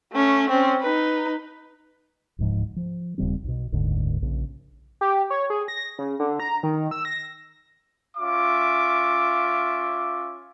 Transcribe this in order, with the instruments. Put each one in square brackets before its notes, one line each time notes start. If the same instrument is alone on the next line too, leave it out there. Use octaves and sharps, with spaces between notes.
[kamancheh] A3 C#4
C4 C#4
D#4 B4
[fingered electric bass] D1 C#2 G#2 F3
F3
D#1 C#3 G3 C4
B1 B2
F#1 D2 G#2 D3
A#1 C#3
[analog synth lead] G4
C#5
G#4
A#6
C#3
D3
A#5
D#3
E6
A#6
[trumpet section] C#4 F4 E5 D6